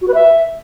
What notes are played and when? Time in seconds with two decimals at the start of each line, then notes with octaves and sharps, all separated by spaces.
0.02 F#4
0.08 B4
0.14 E5